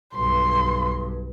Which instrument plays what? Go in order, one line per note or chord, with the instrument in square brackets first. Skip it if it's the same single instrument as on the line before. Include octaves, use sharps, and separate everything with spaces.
[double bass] B1 G2 [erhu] C6